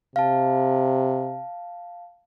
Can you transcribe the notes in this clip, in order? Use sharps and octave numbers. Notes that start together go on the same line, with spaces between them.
C3 F5 A5